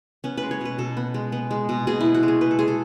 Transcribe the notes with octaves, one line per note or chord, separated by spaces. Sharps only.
B3 C#4
G#3 B4
C#5
B2 B4
B2 A4
B3
G#3
B3
G#3
B2
B2 G#4
B3 E4
F#4
G#3
G#4
B3 B4
A4
G#3 G#4
A4